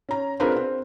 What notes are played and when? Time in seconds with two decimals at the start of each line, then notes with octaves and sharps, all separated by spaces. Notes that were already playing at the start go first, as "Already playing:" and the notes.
0.09 C#4 A#5
0.40 C4 D4 F4 G#4 A#4 B4
0.56 C4